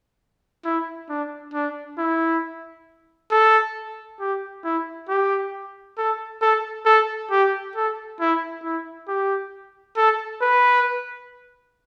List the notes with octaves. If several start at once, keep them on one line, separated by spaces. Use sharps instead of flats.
E4
D4
D4
E4
A4
G4
E4
G4
A4
A4
A4
G4
A4
E4
E4
G4
A4
B4